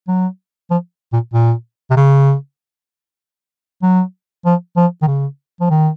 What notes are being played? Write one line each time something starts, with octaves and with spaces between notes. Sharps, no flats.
F#3
F3
A#2
A#2
C3
C#3
F#3
F3
F3
D#3
C#3
F3
D#3